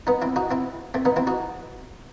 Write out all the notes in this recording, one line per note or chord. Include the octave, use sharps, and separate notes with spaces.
B3 D#4
C4 E4
D#4 F#4
C4 E4
A3 C4
B3 D#4
C4 E4
D#4 F#4